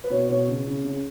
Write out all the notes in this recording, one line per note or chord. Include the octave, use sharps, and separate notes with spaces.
B4
B2 C#5
B2 C#5
C#3
C#3
C#3